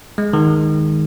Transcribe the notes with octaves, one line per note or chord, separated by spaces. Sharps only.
G#3
D#3